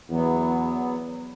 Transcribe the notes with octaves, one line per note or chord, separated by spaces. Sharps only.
E2 F#3 B3